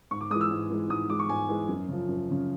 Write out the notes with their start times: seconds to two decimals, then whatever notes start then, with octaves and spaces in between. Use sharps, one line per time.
0.11 G#2 C#6
0.21 D6
0.30 G#3 D#6
0.34 E3
0.41 E6
0.51 G#2
0.70 E3 G#3
0.90 G#2 D#6
1.10 E3 G#3 D6
1.19 C#6
1.29 G#2 G#5
1.49 E3 G#3
1.69 F#2
1.89 C#3 F3
2.09 F#2
2.28 C#3 F3